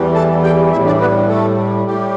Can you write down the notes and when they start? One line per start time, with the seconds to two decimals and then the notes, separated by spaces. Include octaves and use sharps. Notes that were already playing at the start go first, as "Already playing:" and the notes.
Already playing: E2 E3 G3
0.14 A4 A5
0.43 G4 G5
0.72 A2 G3 E4 E5
0.86 D4 D5
1.01 B3 B4
1.29 A3 A4
1.87 A2 G3 G4